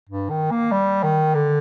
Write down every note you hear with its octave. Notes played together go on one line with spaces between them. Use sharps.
G2
D#3
A#3
G3
D#3
D3